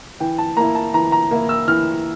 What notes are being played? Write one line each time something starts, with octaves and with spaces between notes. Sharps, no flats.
E3 G5
A5
A#3 E4 A#5
A5
E3 A#5
A#5
A#3 E4
E6
E3 F6